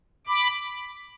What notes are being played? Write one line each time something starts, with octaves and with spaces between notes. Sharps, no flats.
B5 D6